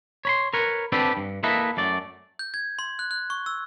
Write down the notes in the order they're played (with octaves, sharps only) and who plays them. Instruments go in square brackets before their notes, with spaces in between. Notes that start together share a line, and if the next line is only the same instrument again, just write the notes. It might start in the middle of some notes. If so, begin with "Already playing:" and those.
[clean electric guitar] C#5 B5 C6
A#4 B4 C#5
B3 C4 D4 G4 A4 B4
G2
A#3 E4 A4 B4 D#5 E5
F#2 A3 D5
[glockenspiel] G6
G#6
C6
F#6
F#6
C#6
E6